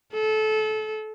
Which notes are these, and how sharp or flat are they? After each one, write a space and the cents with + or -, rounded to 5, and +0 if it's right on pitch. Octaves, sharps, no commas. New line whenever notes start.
A4 -25